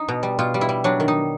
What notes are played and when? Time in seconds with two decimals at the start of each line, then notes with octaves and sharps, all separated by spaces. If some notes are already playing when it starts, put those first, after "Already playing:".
Already playing: D#4
0.08 B2
0.23 G3
0.39 B2 F4
0.54 G3
0.61 E4
0.69 G3
0.84 F#3 D4
1.00 D#3
1.08 D#4